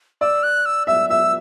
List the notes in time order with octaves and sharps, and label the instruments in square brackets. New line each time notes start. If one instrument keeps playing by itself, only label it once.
[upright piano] D5 [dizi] E6
[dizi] F#6
E6
[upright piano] E5 [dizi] E6
[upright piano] E5 [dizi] E6